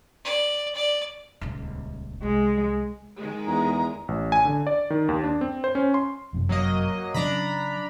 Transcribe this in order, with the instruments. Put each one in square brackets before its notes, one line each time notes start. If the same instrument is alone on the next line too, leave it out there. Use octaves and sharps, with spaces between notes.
[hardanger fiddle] D5
D5
[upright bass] D#1 C#2
[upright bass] C2 [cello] G#3
[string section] D#3 G#3
[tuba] E2 [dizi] A#5
[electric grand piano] A1
G#5
D3
D5
D#3
D#2
D4
C4
C5
C#4
C6
[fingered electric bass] G1 F#2 C3
[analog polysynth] F#3 A#3 D#5
[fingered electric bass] C#3 F#3 C#4 [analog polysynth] D4 A#5 B5